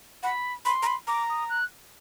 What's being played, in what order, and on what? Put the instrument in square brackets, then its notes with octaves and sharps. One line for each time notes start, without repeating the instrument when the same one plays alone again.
[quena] F#5 [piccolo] B5
[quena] B5 [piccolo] C6
[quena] A#5
B5
[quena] A#5 [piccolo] D6
[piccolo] D#6
F#6